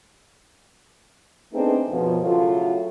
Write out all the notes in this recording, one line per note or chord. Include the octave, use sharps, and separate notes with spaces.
A3 B3 C4 D4 D#4 G#4
F#2 B2 F3
A2 C#3 F#3 A3 F4